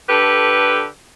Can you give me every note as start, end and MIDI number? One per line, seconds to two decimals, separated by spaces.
0.08 0.85 50
0.08 0.85 67
0.08 0.85 69
0.08 0.85 71